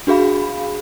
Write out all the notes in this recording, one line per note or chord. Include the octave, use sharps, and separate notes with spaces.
D4 F#4 G#4 F5 B5